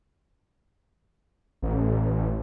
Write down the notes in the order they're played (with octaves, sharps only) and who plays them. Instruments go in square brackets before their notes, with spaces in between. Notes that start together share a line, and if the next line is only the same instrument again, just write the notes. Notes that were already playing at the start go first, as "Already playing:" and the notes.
[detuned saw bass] A1